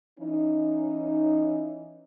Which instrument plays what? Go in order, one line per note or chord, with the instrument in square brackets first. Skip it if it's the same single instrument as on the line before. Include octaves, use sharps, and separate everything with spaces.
[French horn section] E3 C#4 D#4